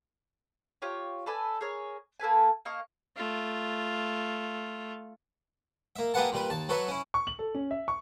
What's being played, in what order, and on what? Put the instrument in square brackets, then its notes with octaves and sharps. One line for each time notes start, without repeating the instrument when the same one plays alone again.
[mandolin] F4 G4 C#5
A4 B4 D5 G#5
G#4 A#4 C#5
A#3 A4 B4 G#5
A#3 D#5 F5 C#6
[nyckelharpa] A3 F4
[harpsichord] A#3 E5
A#3 G4 G#4 B4 F#5 A5
A#2 G3 B4
D#2 A5
F#3 A4 B4 C#5 E5
C#4 E4
[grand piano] C#6
F#7
A4
C#4
E5
C#6